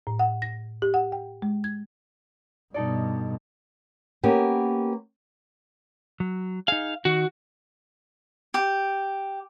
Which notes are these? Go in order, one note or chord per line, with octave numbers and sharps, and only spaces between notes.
A2
F#5
A#6
G4
F#5
G5
G#3
G#6
G2 B2 D#4 A4 D5
A#3 B3 C#4 G4
F#3
D#4 G#4 F5
D#3 F#4
G4